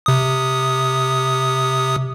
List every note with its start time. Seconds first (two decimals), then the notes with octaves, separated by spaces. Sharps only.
0.06 C3 D#6